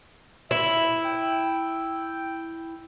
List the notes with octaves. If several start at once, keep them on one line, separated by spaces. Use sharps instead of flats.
E4 E5
G5